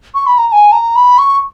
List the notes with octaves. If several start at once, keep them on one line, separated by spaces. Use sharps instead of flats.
C#6
B5
A#5
A#5
G#5
A#5
B5
C#6